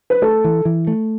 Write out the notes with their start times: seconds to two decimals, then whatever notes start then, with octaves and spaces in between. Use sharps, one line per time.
0.10 B4
0.22 A3 A4
0.44 E3
0.65 E3
0.87 A3